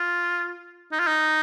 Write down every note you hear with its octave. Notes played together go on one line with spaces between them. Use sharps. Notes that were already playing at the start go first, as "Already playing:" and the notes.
Already playing: F4
D#4
F4
D#4